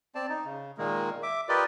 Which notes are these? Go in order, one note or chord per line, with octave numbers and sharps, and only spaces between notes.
C4 D5 A5
D#4
C#3
A#2 D#3 G#3 A#3
E5 D6
F4 G4 A#4 B4 D5 D#5